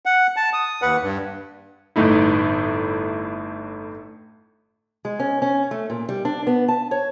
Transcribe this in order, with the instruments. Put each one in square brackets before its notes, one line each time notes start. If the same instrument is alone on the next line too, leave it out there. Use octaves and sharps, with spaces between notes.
[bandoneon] F#5
A5
D#6
D#2 B4 F#5
G2
[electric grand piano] G1 A2 A3 D#4 E4
[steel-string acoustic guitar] G#3
C#4
C#4
A3
A#2
G3
D4
B3
A5
C#5